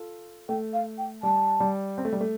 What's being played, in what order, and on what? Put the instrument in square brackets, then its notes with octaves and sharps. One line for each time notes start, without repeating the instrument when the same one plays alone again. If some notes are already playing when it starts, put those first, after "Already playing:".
Already playing: [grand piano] F4 A4
[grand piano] A3 [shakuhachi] G5
[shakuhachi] F5
G5
[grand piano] G3 [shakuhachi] A5
[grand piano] G3
C4
A3
G3
A3